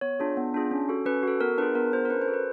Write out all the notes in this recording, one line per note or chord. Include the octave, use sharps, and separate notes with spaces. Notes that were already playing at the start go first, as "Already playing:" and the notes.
B3 C#5
D4 F4 G#4
B3
D4 F4 G#4
C#4
F#4 A4
C#4 B4
F#4 A4
B3 A#4
D4 F4 G#4 B4
B3 A#4
D4 F4 G#4 C5
A#4
C#4 B4
C5
F#4 A4
B4